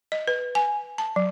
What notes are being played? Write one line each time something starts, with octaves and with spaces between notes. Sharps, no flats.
D#5
B4
G#5
A5
F#3